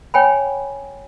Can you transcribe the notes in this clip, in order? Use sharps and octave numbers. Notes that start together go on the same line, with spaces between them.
C#5 G5 G#5 B5